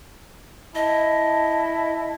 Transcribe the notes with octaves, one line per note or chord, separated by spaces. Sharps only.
E4 D#5 A5